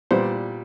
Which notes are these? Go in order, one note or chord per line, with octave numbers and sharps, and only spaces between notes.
A#2 G3 B3 C5